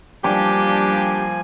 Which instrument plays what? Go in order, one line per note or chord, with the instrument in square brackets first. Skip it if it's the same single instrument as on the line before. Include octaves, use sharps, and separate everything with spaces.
[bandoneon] F3 G#5 [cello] G3 A#3 [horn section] D4 G4 [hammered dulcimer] D6